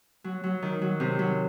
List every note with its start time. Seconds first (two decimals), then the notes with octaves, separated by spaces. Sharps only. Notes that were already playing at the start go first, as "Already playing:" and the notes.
0.24 F#3
0.44 F#3
0.62 D#3
0.82 F#3
1.00 C3
1.19 F#3